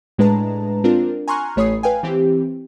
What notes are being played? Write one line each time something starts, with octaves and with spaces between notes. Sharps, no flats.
A2 G#3 D4 B4 A5 A#5
C4 D4 F4 A#4
G#5 A#5 C6 C#6 F6 F#6
A1 A3 C#5 B5 D#6 C7
B4 F5 G5 G#5
E3 C4 G4